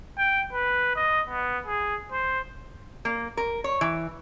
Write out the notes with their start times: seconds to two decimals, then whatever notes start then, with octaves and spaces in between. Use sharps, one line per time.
0.18 G5
0.53 B4
0.96 D#5
1.29 B3
1.66 G#4
2.12 C5
3.05 A#3
3.37 A#4
3.64 C#5
3.81 E3